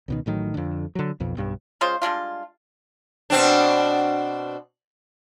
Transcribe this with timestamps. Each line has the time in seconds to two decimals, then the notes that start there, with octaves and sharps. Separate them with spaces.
0.08 C#2 B2 D#3
0.26 A1 A2 D#3 F#3
0.54 F2 D3
0.95 D3 F#3
1.20 B1 F2 B2
1.37 B1 G2
1.81 C#3 G#3 F4 C5
2.02 G3 G#3 D4 F4
3.30 B2 C4 D4